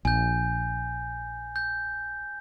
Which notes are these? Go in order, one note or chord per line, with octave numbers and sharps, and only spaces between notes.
A#1 G#5 G6
G6